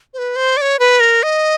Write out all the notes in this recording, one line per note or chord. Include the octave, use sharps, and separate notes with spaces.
C5
B4
C5
D5
C#5
B4
A#4
D#5